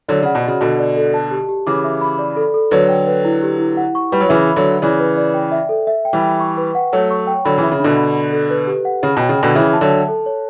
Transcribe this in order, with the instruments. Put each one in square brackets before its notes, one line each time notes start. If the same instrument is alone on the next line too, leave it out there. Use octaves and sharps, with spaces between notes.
[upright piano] D3 F#3 [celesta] D5
[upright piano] C#3 [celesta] F#5
[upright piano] B2
[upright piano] C#3 [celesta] F#4
[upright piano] B2 D3 [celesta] F#4
[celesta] D5
A4
A5
G4
G4
[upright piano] C#3 E3 [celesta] D6
[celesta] E5
B5
D5
A4
A4
[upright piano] D3 F#3 [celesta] B4
[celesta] G5
B4
E4
G4
E4
F#5
C#6
[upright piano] G3 [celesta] B4
[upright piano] F#3
[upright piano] C#3 E3 [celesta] E5
[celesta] B5
[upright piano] D3 F#3
[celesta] C#5
[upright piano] C#3 E3 [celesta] D5
[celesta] B4
D5
G5
E5
A4
E5
G5
[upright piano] E3 G3
[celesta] G5
C#6
B4
F#5
[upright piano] F#3 A3 [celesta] C#5
[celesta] C#6
G5
[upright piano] D3 F#3 [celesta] B5
[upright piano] C#3 E3
[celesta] E5
[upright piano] C#3
[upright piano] B2 D3 [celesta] D4
[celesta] B5
B5
A4
B4
G4
F#5
[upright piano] C#3 [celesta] C#5
[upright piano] B2 [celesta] G5
[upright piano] C#3
[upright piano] B2 D3 [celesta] G5
[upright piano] C#3 E3 [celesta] E5
[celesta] A5
[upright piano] D3 F#3
[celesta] A5
A4
C#5